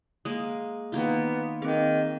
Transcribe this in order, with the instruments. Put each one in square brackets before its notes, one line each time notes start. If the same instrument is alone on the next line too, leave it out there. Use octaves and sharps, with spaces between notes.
[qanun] G#3 A#3 [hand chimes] D#6
[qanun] D#3 A#3 F4 [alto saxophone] B3
[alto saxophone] D#3 [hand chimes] C4 G#4 [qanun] F5